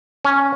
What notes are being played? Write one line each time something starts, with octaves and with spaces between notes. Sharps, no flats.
C#4